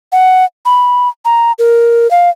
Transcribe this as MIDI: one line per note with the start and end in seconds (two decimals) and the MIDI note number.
0.12 0.45 78
0.66 1.08 83
1.25 1.52 82
1.59 2.10 70
2.11 2.30 77